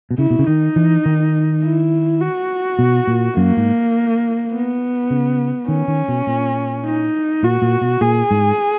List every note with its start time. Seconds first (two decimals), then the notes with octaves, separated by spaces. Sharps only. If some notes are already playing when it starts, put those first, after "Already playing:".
0.11 B2
0.18 C#3 E4
0.30 B2
0.39 C#3
0.47 D#3 D#4
0.76 E3
1.06 D#3
1.63 E4
2.21 F#4
2.79 B2
3.07 A#2
3.37 F#2 A#3
3.57 G#2
4.53 B3
5.10 C#3
5.68 D#3 C#4
5.88 D#3
6.08 B2
6.27 A#2
6.85 D#4
7.43 A#2 F#4
7.62 A#2
7.82 B2
8.01 A#2 G#4
8.31 G#2